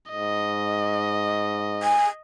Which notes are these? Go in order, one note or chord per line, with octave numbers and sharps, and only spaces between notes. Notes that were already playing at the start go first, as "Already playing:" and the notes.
G#2 D#5
G#5